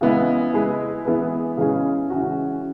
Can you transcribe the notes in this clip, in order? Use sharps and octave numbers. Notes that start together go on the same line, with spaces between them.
C#3 E3 G#3 B3 E4
G#3 E4 G#4 B4
E3 B3 G#4 B4
C#3 E3 G#3 C#4 G#4
E3 C#4 F#4